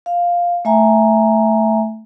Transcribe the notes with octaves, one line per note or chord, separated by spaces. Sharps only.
F5
A3 E5 G#5 A#5